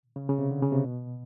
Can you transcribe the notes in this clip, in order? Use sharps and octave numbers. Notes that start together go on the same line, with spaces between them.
C#3
C#3
C3
D3
C#3
C3
B2